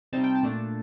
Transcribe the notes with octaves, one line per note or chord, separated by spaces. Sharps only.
C3 G3 C4 D#4 A5
G5
A5
A#2 A3 D4